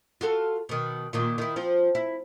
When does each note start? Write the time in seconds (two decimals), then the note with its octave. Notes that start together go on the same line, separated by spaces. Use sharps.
0.21 F4 F#4 A4
0.69 B2 D#3
1.13 A#2 D#3 F4
1.38 D#3 E4
1.56 F3 C4 F4
1.95 E4